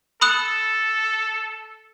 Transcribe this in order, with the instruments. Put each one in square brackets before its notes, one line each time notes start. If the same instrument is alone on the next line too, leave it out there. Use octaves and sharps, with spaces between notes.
[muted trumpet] A4 [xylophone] B5 D#6 F#6